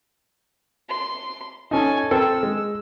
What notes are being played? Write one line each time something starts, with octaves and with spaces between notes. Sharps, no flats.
C6
C#4 D#4 A4 G#5
C4 A4 A#4 E6
G#3